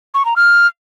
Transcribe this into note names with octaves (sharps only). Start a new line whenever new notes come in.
C#6
A#5
F6